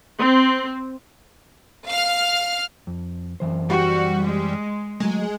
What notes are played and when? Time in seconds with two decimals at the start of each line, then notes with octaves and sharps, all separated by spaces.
0.20 C4
1.88 F5 F6
2.87 F2
3.40 F#2 E3 C5
3.70 G3 F#4
4.25 G#3
5.00 F#3 G#3 A3